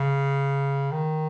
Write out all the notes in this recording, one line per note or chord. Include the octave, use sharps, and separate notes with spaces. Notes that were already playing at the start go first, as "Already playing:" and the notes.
Already playing: C#3
D#3